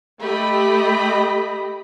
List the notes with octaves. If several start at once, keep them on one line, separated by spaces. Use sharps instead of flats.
A3 G4 D#5 B5